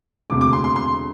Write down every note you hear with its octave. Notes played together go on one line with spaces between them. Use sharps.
E1 D2 C3 D6
D6
C6
C6
C6